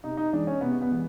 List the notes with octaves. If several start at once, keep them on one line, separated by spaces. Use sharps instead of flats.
C3 D#4
D#4
E3 G#3 D4
C#4
C3 B3
B3
E3 G#3